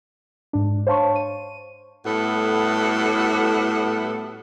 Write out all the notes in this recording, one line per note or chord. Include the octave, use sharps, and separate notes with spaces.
G#2 D4
C5 C#5 F5 A5 C6 C#6
D#7
A2 G3 B3 F#4 A4